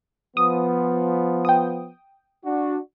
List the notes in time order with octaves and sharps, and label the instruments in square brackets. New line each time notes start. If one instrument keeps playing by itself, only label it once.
[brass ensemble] F3 B3 [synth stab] D#6
[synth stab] G5 D#6
[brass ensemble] D4 F#4